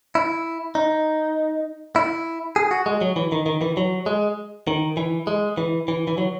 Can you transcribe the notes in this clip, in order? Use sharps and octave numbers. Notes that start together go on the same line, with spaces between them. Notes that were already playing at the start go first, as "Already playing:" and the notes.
E4
D#4
E4
G#4
F#4
G#3
F#3
E3
D#3
D#3
E3
F#3
G#3
D#3
E3
G#3
E3
E3
E3
F#3